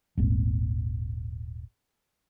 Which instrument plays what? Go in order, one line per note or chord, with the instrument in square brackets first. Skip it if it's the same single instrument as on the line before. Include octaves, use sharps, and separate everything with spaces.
[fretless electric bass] D#1 G#1